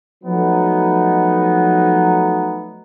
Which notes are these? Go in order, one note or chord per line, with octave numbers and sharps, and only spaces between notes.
F3 F#3 A3 B3 D#4